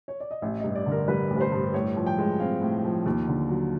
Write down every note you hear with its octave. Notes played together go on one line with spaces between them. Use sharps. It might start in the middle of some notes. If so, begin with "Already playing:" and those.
C#5
D5
D#5
A1 E5
G2 D#5
D5
D3
A#4
G3 B4
A1
B4
C5
G2
A2 C#5
F3
G5
G#3
C4 F5
A2
F3
D#2
D3
F#3